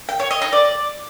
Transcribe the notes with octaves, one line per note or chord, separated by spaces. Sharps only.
G5
C#5
D#5
D#4
D5